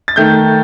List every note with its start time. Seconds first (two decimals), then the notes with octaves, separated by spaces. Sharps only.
0.08 A6
0.16 D#3 A3 G6